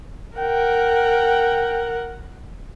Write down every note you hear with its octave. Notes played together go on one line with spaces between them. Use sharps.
A#4 F#5 G5